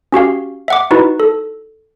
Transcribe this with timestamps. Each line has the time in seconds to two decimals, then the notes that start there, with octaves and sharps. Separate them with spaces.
0.12 C#4 F#4 G4 F5
0.68 E5 F#5 D6
0.91 D#4 E4 F#4 B4
1.20 A4